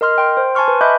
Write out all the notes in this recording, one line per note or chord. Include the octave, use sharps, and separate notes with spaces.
A#4 D#5 C6 F6
G5 C6
C5
G#5 A5 C6 C#6 F6
B4
D#5 E5 B5 D6 F#6 G6